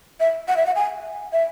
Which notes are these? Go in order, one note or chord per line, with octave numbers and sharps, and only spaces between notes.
E5
F#5
E5
F#5
G#5
E5